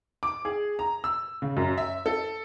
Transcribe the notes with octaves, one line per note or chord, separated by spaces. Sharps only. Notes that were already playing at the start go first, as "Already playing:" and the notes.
D6
G#4
A#5
E6
C#3
F#2
E5
A4